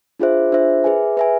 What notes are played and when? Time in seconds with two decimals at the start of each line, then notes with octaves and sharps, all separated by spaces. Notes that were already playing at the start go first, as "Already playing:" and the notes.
0.20 D4 F4 G#4 C5 E5
0.52 D4 F4 G#4 C5 E5
0.84 G#4 B4 E5 G#5
1.17 G#4 B4 E5 G#5